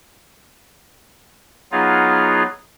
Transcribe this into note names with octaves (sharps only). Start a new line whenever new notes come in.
F#3 B3 D#4 F4 G#4 F5